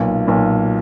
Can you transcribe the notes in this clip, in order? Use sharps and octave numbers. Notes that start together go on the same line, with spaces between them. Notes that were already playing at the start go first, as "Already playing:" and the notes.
Already playing: B1 A#2
B1 A#2